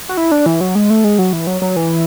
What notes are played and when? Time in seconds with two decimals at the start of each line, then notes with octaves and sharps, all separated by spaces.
0.09 F#4
0.17 E4
0.32 D4
0.46 E3
0.61 F#3
0.75 G#3
0.90 A3
1.04 G#3
1.19 F#3
1.33 E3
1.47 F#3
1.62 F#3
1.76 E3